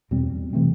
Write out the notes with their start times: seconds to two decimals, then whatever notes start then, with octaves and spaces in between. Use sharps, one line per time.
0.11 E2 B2 G3 C4
0.53 C3 E3 A3 C4